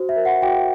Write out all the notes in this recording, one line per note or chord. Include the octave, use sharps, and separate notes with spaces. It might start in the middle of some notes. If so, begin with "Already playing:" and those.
Already playing: F#4 C5
E5
A#4
F#5
F#4 G5